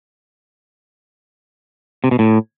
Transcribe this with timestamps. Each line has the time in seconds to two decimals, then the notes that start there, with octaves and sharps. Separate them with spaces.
2.04 C3
2.11 B2
2.19 A2